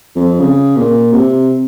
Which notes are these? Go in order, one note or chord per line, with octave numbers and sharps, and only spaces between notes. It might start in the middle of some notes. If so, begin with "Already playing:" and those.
F2
C#3
A#2
C3